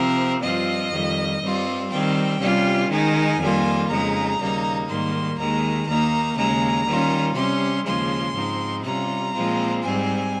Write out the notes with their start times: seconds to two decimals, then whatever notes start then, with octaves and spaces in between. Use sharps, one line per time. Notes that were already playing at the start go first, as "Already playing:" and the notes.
Already playing: C3 F3 C4 A#4
0.42 G2 F3 C4 F4 D#5
0.92 F2 D#3 G3
1.41 G2 G3 C4 F4
1.90 D#3 G3 C4 G5
2.40 C3 G3 C#4 F4
2.89 D#3 G#3 D#4 G#5
3.38 F2 D#3 G3 A#3 F4
3.88 F2 C#3 G#3 D#4 A#5
4.39 D#2 C#3 G3 A#3 D#4
4.88 G#2 D#3 G3 A#3 C6
5.37 D#2 D#3 G#3 A#5
5.87 D#2 D#3 A#3 D#4 A#5
6.36 D#2 C#3 G#3 A#5
6.85 D#3 G3 C#4 F4
7.34 C3 G3 C#4 C6
7.85 D#2 C#3 F3 G#3 C6
8.34 G#2 F3 C4 D#4
8.84 C3 G3 C#4 F4 A#5
9.32 A#2 F3 G#3 C4 F4
9.82 G#2 G3 C4 G#5